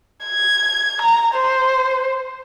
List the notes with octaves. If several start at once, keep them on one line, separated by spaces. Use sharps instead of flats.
G#6
A#5
C5